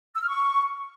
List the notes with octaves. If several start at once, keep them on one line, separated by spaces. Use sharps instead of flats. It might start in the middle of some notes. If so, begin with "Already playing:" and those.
E6
F6
C#6